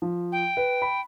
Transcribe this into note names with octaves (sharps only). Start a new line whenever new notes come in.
F3
G5
B4
B5